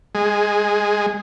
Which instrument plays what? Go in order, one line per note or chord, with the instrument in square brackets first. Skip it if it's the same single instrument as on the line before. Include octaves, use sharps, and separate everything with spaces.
[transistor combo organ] G#3